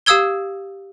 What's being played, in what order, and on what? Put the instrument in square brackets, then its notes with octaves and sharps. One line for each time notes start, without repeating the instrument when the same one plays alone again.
[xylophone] G4 F5 D#6 E6 G#6 G7